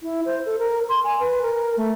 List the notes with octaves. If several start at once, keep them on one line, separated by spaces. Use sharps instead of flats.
E4
C5
A4
A#4
C6
G#5
B4
A#4
A3